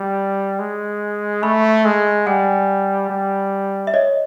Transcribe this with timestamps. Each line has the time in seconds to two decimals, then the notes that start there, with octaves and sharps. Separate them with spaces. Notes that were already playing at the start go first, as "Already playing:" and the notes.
Already playing: G3
0.59 G#3
1.43 A3 B5 C#6
1.85 G#3
2.26 G3 F#5 G#5
3.10 G3
3.87 E5
3.94 C#5 D#5